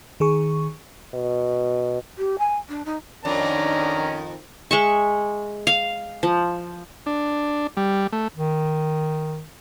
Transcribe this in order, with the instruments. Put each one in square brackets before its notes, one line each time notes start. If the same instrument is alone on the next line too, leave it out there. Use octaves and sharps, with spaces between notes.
[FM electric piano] D#3 G#4 C#6
[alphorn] B2
[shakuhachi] G4
G#5
D4
D#4
[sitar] F2 [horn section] D#3 [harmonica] C#4 A#5 [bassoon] D4
[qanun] G#3 E5 C#6
F5
F3
[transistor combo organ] D4
G3
A3
[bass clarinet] D#3